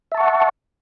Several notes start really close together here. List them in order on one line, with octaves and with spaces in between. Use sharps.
E5 A5 C#6 F#5